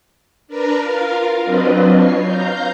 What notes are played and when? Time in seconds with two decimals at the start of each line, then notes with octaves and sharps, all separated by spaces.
0.48 D4 A#4 B4 A#5
0.83 F4 A#4 F5
1.44 F#3 C4 D4 F4 B4 D#5
1.92 C#5 C#6 C7
2.22 F5 A#5 G6